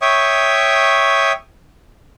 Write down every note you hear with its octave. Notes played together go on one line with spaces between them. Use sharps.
C#5 E5 G5 C#6 D#6